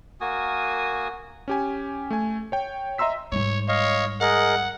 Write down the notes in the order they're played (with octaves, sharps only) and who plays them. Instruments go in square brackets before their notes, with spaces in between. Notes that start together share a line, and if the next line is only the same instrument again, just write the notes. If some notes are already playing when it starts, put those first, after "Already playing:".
[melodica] A#3 F#4 G#5 D#6
[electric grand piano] C#4 G4 G#5
A3 G#5
C#5 G5
D#5 E5 A#5 C6 E6 B6
[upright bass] G#2 G3 [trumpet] C#5
[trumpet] C#5 [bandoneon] D#5 F5
[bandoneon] G#4 A#4 D#5 [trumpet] F#5